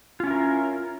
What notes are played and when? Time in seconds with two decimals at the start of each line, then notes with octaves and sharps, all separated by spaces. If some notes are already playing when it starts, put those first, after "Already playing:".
0.20 F4
0.24 C#4
0.27 E4
0.31 A#4